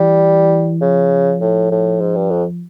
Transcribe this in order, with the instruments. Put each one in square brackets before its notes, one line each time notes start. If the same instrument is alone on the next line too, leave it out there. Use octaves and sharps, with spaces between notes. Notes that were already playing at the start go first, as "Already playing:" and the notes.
Already playing: [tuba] E3 [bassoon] G3
[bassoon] C#3 [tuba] F3
[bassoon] A2
A2
G#2
G2
F2